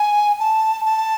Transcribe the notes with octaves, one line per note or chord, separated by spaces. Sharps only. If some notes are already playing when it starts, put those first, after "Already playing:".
Already playing: G#5
A5
A5